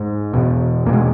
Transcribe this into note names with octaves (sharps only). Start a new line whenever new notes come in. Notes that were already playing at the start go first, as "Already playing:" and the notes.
Already playing: G#2
E2 B2
E2 B2 G#3 A#3